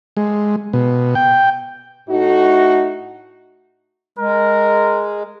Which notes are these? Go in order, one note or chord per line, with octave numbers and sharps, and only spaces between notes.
G#3
B2
G5
A2 A3 D#4 F#4
G#3 A#4